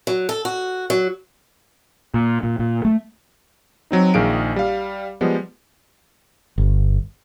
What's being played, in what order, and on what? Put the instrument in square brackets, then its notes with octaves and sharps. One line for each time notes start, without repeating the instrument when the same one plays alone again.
[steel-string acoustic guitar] F#3
A4
F#4
F#3
[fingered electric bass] A#2
A#2
A#2
A3
[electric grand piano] F#3 C4 D#4
A#1 D#3 G#4 F5 D7
G3 F5
F3 G3 G#3 B3
[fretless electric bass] G1